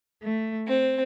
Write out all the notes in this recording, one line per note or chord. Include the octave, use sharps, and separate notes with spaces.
A3
C4